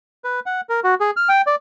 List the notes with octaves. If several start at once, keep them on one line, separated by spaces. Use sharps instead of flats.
B4
F#5
A#4
F#4
G#4
F6
G5
D5